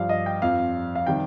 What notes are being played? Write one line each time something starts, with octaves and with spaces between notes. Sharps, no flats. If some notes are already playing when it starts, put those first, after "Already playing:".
Already playing: G2 F3 F5
D#5
G5
F2 F3 F5
F5
C3 D#3 G3 G5